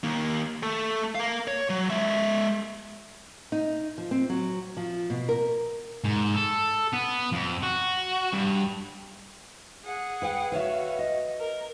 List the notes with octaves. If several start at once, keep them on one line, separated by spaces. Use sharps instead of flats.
D#3 A#3
A3 A4
A#4 F5
C#5
F#3
G#3 E5
D#4
F3
C4
F#3
F3
B2
A#4
G#2
A4
B3
F2
F#4
G2
G#4 F#5
B4 F5 G5
F#4 B4 C#5 E5 F5
D#5
A#4